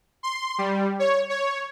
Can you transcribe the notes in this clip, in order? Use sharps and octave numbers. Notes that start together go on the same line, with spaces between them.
C6
G3
C#5
C#5